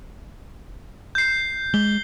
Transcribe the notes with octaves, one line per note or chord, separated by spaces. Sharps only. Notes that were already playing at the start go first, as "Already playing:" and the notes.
G6 C7
G#3 G7